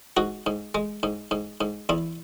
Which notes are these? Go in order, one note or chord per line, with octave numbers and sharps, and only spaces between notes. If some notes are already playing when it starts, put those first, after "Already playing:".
G#2 F#4
G#2
G#3
G#2
G#2
G#2
E2 E4